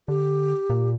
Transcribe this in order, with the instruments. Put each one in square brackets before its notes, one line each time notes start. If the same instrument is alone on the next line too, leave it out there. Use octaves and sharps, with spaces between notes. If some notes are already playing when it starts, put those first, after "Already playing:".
[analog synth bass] D3 [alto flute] G4
[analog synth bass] A#2